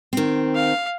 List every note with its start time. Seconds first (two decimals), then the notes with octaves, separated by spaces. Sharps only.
0.13 D#3 C4
0.55 F5